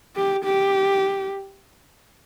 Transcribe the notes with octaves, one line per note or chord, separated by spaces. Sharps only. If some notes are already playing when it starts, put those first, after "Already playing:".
G4
G4